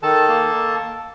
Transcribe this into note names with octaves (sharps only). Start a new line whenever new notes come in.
D#3 A4 A5
A#3